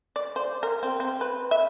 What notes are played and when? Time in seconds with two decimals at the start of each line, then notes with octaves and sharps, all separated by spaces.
0.16 D5
0.36 C5
0.63 A#4
0.83 C4
1.00 C4
1.21 B4
1.51 E5